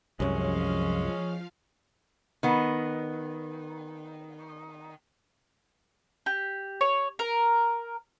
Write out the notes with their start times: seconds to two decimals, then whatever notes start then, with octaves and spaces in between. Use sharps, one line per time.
0.20 C2 F#2 F3 G#3 C#4 F5
2.43 D#3 B3
6.26 G4
6.81 C#5
7.19 A#4